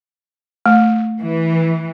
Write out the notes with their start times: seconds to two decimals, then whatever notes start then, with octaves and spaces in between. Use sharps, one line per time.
0.66 A3
1.21 E3